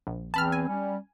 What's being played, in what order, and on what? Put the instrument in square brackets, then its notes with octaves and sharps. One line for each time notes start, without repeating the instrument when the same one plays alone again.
[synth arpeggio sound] A#1
[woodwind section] E2 E3 C4 [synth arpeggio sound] A5 B5 F6
[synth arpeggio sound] G#5
[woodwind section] G3 C#4